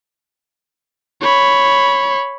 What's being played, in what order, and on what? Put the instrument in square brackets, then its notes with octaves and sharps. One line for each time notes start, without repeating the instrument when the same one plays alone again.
[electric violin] C#5 B5